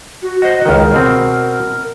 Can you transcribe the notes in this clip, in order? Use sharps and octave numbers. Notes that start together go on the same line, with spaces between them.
F#4
F#4 C5 D#5
C#2 D#3 A#4
B2 C4